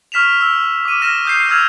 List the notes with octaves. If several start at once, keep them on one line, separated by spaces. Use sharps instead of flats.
C#6 F6 B6 E7 F7
E6
D6 D#7
F6 A#6 E7
D#6 G6 C7
E6 F6 G#6 F7